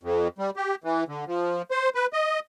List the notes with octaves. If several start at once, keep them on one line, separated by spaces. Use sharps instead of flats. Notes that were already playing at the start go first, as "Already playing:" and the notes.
F2
G3
G4
E3
D3
F3
C5
B4
D#5